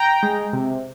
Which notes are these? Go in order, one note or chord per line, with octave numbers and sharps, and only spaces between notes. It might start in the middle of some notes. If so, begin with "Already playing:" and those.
Already playing: G5 A#5
G#3
C3